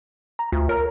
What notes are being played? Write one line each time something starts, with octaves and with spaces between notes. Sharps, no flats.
A#5
D2 F4
A#4 C#5 A#5